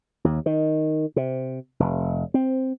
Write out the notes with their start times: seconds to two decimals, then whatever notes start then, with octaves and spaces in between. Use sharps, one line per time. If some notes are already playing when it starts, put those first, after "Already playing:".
0.24 D#2
0.46 D#3
1.16 C3
1.80 F1
2.34 C4